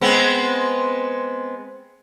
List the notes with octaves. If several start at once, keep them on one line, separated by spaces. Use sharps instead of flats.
G#3 B3 C4